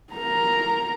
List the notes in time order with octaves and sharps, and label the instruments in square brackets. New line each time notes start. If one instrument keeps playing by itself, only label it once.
[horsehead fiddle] A#4 A#5